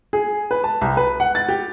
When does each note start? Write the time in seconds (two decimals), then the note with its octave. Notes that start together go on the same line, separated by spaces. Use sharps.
0.13 G#4
0.51 B4
0.64 A5
0.81 C2
0.97 B4
1.20 F#5
1.35 A6
1.49 G4